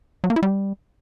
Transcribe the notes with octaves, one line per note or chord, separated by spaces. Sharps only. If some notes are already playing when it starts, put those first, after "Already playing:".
F#3
A#3
E4
G3